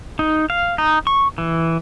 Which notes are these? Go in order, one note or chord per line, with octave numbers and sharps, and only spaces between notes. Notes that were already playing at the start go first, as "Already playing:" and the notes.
D#4
F5
D#4
C#6
E3